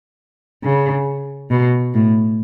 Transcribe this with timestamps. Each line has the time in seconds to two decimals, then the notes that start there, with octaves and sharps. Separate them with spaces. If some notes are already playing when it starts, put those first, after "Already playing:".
0.64 C#3
1.51 B2
1.94 A2